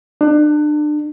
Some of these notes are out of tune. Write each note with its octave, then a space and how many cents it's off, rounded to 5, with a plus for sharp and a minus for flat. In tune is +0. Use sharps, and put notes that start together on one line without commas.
D4 +30